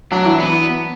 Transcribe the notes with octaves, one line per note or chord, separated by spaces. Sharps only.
F#3 D4
E3
B3